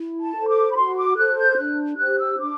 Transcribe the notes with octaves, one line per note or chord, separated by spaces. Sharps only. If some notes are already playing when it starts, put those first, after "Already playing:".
Already playing: E4
A5
A4 C5
D6
B5
F#4 C6
D6
A4 C5 F#6
G6
D4 F#6
G4 C5 F#6
E6
D4 D6